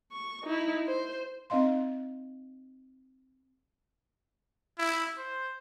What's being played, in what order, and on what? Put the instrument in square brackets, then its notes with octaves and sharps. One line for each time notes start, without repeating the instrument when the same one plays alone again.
[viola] C#6
D#4 E4
C5
[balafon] C4 D#4 D#5 F5 C6
[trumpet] E4
C5